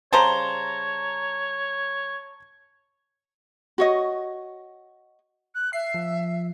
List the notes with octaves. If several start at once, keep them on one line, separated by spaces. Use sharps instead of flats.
C#3 G3 C5 C#5 A5 A#5
F#4 C#5 D#5
F#6
E5 C7
F3